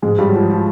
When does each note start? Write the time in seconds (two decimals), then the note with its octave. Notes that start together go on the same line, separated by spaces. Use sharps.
0.02 G#2 G#3
0.18 G2 G3
0.28 F#3
0.34 F3
0.50 F3